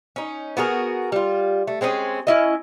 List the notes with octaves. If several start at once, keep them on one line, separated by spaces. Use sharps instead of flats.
C#4 D#4
B3 F#4 G#4 A#4
G3 F4
A3
G#3 C4 C#4 G#4
C#4 E4 D#5